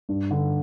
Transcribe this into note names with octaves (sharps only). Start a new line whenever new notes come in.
G2
D3